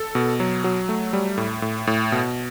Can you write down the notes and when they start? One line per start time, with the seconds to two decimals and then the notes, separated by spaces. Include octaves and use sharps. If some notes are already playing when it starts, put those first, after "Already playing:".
Already playing: A4
0.15 B2
0.40 F#3
0.64 F#3
0.89 A3
1.13 G3
1.38 A2
1.62 A2
1.87 A2
2.12 B2